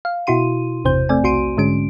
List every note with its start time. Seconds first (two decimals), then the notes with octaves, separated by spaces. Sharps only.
0.05 F5
0.27 B2 E4 F#4 C6 D#7
0.85 G1 E2 C3 C5 G6
1.09 A3 C4 D5 G#5
1.24 B1 F#4 C6 D7 D#7
1.57 G#2 D3 G#3 C#4 D7